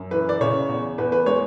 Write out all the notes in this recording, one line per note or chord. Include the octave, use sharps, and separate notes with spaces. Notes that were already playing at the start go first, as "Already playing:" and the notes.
Already playing: F#2
E3 B4
D5
C#3 C#5
E2
E2 B4
B4
G#3 C#5